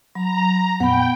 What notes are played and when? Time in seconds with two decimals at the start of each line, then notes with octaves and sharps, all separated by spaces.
0.15 F#3 A#5 B5
0.80 F2 A#2 B3 F#5 G5 B5